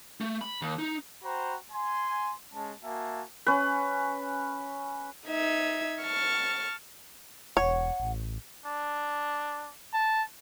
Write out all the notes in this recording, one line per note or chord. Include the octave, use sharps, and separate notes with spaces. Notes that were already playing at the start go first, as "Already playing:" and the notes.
A3
B5
D#2
D#4
F#4 C5 G5 A#5 B5
G#5 C6
G#3 C#4 A5
A#3 F#4 E5 G#5 A5
C#4 B4
D#4 E5 G#6
A5 C#6 F6
E1 C#5 F#5
A1
D4
A5